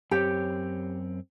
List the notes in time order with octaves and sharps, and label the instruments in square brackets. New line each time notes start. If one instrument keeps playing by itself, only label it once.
[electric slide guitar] F#2 C4 C#5 [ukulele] G4